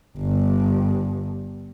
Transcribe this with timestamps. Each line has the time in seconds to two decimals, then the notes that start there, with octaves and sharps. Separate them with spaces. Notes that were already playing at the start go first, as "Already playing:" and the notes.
0.18 G1 G2